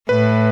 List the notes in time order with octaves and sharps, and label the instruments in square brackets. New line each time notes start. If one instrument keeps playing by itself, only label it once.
[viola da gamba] A2 [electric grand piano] B4